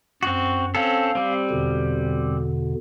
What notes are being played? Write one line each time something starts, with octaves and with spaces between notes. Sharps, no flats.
F#2 C4 F#4
C4 C#4 A4 F5
G3 C4
E2 B2 D3